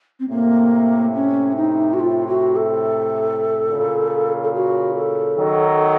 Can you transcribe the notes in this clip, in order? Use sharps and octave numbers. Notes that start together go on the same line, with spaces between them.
C4
A2 C3 A#3
C#4
D#4
F#4
F4
F#4
A4
A#2 C#3
A4
F#4
A4
D#3 F#3